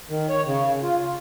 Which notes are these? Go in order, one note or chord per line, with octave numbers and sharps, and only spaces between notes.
D#3
C#5
C#3
F4